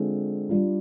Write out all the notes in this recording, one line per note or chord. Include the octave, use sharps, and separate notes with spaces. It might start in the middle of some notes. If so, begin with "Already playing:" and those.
Already playing: D3 G#3 C4 F4
G3 D4 F4